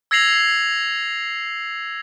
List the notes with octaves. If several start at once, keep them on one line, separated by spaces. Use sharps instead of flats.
E6 G#6 A#6 C7 F7 F#7